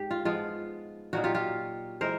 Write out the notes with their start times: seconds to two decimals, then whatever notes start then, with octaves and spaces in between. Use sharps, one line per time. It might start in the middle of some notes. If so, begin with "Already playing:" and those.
Already playing: G#2 G4
0.11 F4
0.25 F3 G#3 B3 F4
1.13 A#2 F#3 A#3 D#4 F#4
1.24 F4 G4
1.35 F4 G4
2.01 E3 G#3 A#4 C5